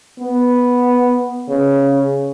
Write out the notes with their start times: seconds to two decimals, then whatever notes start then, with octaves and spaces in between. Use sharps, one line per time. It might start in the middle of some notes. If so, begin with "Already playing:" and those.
0.20 B3
1.49 C#3